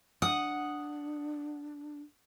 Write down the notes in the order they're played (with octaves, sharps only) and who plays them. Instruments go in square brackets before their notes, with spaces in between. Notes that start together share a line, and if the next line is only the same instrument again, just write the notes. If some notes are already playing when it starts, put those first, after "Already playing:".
[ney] D4 [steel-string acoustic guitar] F#5 [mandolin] D#6